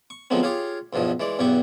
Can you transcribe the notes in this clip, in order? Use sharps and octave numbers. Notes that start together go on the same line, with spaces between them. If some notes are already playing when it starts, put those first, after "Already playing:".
C#6
D3 F3 F#3 G#3 B3 C4
F4 G4 G#4 C#5 F5
B1 E2 G2 F3 D#5
E3 G#3 D5
B1 E2 G2 B3 G4 C#6